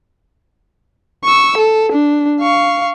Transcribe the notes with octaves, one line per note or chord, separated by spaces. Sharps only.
C#6 E6
A4
D4
F5 C#6